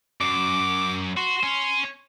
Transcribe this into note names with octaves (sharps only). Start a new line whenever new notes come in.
F#2 D6
F#4 C6
C#4